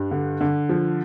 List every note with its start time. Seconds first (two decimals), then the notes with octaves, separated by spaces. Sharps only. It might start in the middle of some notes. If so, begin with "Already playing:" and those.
Already playing: G2
0.11 D3
0.41 D3
0.69 F3